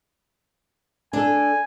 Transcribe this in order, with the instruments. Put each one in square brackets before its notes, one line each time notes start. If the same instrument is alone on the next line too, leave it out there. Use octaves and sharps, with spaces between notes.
[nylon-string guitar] D4 A4 [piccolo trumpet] G#5